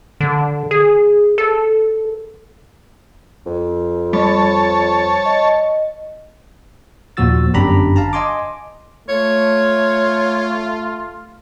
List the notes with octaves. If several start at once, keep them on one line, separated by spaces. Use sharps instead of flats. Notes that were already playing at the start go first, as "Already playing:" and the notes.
D3
G#4
A4
F2
G3 C#5 A5
D#5
D#2 A#2 F3 F#4 E6 A6
G1 F#2 D4 G4 A#5 B5
F5 A5 A#5
D#5 G#5 C6 D6
A3 F4 C#5